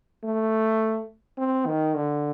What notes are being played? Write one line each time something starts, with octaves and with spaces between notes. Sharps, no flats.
A3
C4
D#3
D3